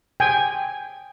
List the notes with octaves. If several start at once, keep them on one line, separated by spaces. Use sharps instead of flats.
G5 G#5